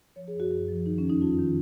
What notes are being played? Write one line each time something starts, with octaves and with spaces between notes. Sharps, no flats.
F3 C#5
G#4
F#2
F#4
F#2 F#4
F3
D#3 D#4
C#4
F2
D#4
F2 F4
D#3